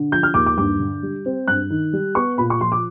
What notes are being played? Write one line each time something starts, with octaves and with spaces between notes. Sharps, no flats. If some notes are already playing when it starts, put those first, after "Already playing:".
Already playing: D3
F3 G6
F6
D#2 D6
D6
G2 D6
D3
G3
C4
G2 F#6
D#3
G3
B3 C#6
A#2 B5
C#6
F3 C6
D6